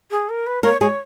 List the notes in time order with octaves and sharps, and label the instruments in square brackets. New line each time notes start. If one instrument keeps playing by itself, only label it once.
[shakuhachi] G#4
A#4
B4
[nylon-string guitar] A#3 A#4 [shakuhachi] C#5
[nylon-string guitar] G#3 G#4 [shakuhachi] C#5